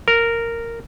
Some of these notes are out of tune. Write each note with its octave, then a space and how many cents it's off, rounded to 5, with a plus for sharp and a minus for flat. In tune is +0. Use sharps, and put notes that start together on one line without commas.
A#4 -10